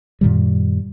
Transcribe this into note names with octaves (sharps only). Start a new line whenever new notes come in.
F#2 A#2 D#3 G3